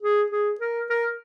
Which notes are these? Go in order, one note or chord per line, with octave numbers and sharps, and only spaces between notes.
G#4
G#4
A#4
A#4